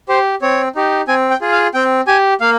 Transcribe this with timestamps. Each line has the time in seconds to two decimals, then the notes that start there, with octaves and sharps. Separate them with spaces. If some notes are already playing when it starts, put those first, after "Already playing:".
0.09 G4 C5
0.42 C4 C#5
0.75 D#4 G4
1.08 C4 G#5
1.30 G5
1.41 F4 G#4
1.52 F5
1.74 C4 G5
2.07 G4 G#5
2.40 A#3 F5